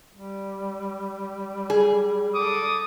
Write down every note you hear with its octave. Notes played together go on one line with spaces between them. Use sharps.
G3
G#4
A4 D6 D#6